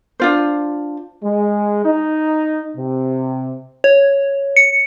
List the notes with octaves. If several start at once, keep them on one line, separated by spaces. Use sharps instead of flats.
D4 F4 C5
G#3
D#4
C3
C#5
C#7